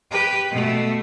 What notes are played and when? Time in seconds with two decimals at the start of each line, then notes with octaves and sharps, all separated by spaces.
0.11 G4 B4
0.51 B2 A3